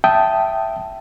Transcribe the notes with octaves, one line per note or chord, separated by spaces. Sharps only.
E5 G5 A5 D#6